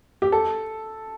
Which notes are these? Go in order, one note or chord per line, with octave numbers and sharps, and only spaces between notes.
G4
A4